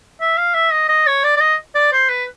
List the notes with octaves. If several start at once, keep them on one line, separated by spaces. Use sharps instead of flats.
E5
F5
E5
D#5
D#5
C#5
D5
D5
D#5
D5
C5
B4